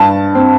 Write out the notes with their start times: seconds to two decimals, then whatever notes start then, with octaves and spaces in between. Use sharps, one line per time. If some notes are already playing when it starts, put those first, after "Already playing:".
Already playing: G2 A5
0.35 C4